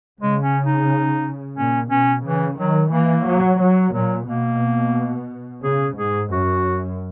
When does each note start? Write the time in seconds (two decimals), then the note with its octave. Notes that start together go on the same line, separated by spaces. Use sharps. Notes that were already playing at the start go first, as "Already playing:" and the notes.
0.21 C#3 G#3
0.43 C#4
0.66 D#4
1.57 A#2 C#4
1.90 B2 C#4
2.24 C#3 E3
2.59 D#3 F#3
2.92 E3 A#3
3.26 F#3
3.61 F#3
3.94 A#2 F#3
4.28 B2 A#3
5.64 C#3 G#4
5.98 G#2 G#4
6.32 F#2 F#4